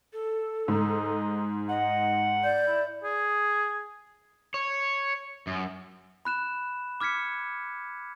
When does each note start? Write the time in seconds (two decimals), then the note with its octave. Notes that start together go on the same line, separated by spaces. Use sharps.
0.13 A4
0.68 G#2 D#4
1.69 D#5 F#5
2.44 D5 G6
2.68 E4
3.04 G#4
4.54 C#5
5.47 F#2
6.25 B5 F#6 E7
7.01 D6 F6 G#6 B6 C#7